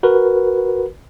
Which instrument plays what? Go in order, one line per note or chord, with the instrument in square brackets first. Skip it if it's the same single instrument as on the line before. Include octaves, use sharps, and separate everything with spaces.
[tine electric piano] F#4 A#4 B4